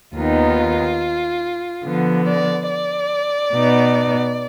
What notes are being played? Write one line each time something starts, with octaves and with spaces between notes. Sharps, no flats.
D#2 D#3 B3 D#4 F4
D3 F3 B3
D5
D5
B2 B3 D#4